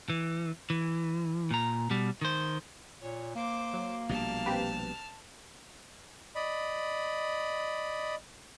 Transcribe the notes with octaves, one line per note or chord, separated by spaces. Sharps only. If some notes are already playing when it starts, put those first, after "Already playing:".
E3
E3
A#2 A#5
B2 G3
D#3 C5
A#2 C#5
A#3 C5 D6
F#3
A#1 B2 G3 A5 F6
C4 G4 B4
D5 D#5 B5